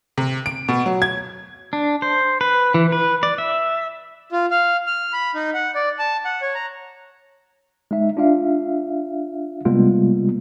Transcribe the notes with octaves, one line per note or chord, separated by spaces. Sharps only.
C3
D7
B2
F#3
G#6
D4
C5
B4
E3
B4
D5
E5
F4
F5
F6
B5
D#4
F#5
D5
A5
F#5
C#5
A#5
G#3 D#4 E5
D4 F4 E5 F5
C3 G3 G#3 A#3 B3 F4